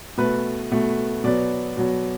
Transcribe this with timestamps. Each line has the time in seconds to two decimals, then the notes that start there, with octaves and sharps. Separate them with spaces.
0.17 B2 A3 B4
0.71 B2 A3
1.24 B2 F#3 B3 D5
1.77 B2 F#3 B3